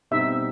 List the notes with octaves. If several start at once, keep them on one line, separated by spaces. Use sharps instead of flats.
B2 G3 C4 D#4 E5